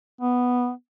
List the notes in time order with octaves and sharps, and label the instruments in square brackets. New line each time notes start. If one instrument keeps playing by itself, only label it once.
[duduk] B3